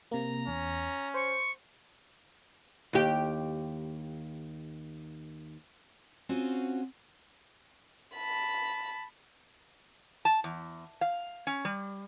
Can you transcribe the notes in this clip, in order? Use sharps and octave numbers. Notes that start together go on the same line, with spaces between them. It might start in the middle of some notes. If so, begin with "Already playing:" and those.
C3 A#3 A#5
E2 C#4
C5 C#6
D#2 G4
C4 C#4 F4 F#4 C5
A5 B5
A5
E2
F5
C#4
G3